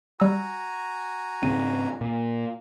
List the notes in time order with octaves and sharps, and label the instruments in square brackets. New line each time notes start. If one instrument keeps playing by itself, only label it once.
[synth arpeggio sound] G3 E6 [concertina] F#4 G#5 A#5
[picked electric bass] G#2 C#3 C4 [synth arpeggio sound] D#7
[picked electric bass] A#2